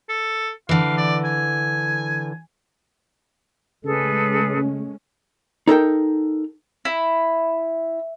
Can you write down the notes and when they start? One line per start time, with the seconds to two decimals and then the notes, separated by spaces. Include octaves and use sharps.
0.09 A4
0.69 D3 E3 F5
0.98 D5
1.25 G#5
3.85 C#3 G#3 A3 C#4 G#4 A4 B4
5.68 D#4 A4 A#4 G5
6.85 E4